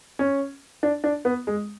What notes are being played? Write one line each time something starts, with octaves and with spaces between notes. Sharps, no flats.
C#4
D4
D4
B3
G#3